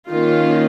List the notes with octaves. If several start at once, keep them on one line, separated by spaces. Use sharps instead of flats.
D#3 A#3 C#4 F4